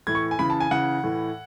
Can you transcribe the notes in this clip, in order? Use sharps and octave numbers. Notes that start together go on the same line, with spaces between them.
A2 E3 G#6
C#6
G#5
C#3 E3 B5
A5
G#5
C#3 E3 F#5
A2 E3